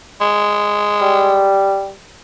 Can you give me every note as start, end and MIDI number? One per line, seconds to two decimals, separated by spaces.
0.21 1.54 56
1.02 1.91 55